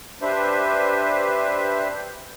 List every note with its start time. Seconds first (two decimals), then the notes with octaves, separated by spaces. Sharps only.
0.22 D4 G4 B4 C5 E5